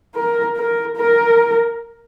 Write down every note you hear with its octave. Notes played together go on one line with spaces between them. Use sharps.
A#4
A#4
A#4